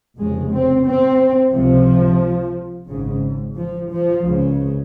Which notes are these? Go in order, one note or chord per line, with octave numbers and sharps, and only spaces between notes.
F1 F2 C#3 G#3
C4
C4
C#2 C3 F3
G#1 G#2 C#3
F3
F3
C#2 C#3